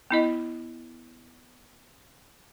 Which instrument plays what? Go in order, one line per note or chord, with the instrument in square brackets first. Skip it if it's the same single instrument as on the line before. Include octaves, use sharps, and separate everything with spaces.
[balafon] B3 E4 D#5